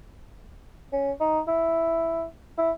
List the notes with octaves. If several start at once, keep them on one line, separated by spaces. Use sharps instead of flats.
C#4
D#4
E4
E4